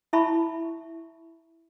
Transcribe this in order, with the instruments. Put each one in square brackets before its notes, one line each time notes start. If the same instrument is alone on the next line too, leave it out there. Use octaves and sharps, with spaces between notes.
[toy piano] E4 E5 A5 B5 C#6